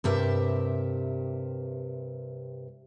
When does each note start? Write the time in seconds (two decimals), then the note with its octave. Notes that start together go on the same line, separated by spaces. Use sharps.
0.04 G2 C3 G4 A#4 E5